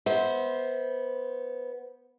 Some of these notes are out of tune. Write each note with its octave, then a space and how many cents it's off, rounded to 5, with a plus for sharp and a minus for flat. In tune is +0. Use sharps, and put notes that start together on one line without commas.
B3 -10 C5 +0 E5 -35